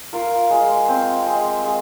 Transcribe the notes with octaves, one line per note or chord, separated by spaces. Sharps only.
F4 A#4
G#3
C4
G#3
G#3